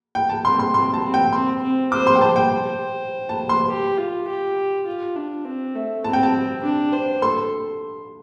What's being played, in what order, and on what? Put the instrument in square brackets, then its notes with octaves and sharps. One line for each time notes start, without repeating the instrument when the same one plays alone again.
[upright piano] G5
A5
[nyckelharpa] C4 [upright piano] C6
[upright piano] C6
[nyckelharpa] C4 [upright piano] C6
[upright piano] A5
[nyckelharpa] C4
[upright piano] G5
[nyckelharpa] C4 [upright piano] C6
[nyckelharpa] C4
[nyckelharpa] C5 [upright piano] D6
[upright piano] C6
G5
[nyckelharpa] C5 [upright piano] A5
[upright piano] G5
[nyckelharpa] C5
[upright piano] A5
C6
[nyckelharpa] G4
F4
G4
F4
D4
C4
A3
[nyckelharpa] C4 [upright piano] A5
[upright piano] G5
A5
[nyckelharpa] D4
C5
[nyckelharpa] A4 [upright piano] C6